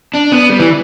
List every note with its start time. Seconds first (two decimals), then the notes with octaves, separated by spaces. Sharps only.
0.15 D4
0.32 B3
0.50 G3
0.60 E3